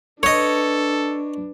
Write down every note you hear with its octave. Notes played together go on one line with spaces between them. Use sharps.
D4 A4 B4 C#5 D#5